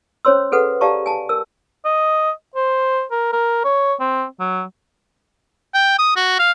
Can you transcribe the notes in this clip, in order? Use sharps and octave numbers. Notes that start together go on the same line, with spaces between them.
C#4 C5 C#5 C6 E6
G#4 A4 B4 F#5
G4 D5 F5 A5 A#5 C#6
G#5 A5
A#4 E6
D#5
C5
A#4
A#4
C#5
C4
F#3
G5
D#6
F#4
F5